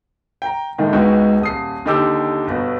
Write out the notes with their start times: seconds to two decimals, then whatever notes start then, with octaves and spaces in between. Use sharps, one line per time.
0.42 G5 A#5
0.78 A2 D3 D#3 G#3 D#4
0.93 C#2 G#3 B3 D#4 F#4 G5
1.41 D#1 D#6 C7
1.85 D#2 D3 D#4 G4 D6 E6
2.47 G1 B2